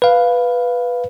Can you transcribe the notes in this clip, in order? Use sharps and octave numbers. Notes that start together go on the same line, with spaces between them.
B4 F5